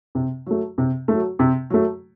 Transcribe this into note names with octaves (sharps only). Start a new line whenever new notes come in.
C3
F#3 A3
C3
F#3 A3
C3
F#3 A3